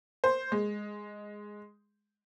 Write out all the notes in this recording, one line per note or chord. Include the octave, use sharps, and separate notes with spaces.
C5
G#3